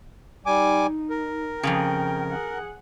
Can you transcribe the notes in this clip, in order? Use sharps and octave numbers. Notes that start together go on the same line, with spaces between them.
G3 D#4 G#5 D6
A#4
F2 G#2 C#3 G5
G#4 F#5